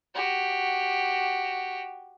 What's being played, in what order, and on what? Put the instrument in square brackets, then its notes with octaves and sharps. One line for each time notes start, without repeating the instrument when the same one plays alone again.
[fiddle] F#4 G4